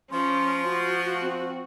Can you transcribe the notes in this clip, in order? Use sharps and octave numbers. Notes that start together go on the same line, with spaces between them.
F3 C#4 C6
F#4
C4